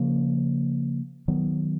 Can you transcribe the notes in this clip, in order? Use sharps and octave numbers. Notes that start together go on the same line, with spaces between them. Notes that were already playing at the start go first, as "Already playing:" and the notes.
Already playing: C#3 F3 A#3
D#3 F#3 B3